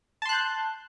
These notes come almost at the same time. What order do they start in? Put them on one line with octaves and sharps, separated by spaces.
A5 C6 F#6 G6